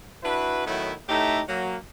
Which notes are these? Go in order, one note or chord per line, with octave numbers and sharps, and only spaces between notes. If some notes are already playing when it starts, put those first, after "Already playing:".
D4 E4 F#4 B4
A2 D#3 F#3 A3 B3 E4
A2 A3 D#4 G4 E5 A#5
F#3 A#3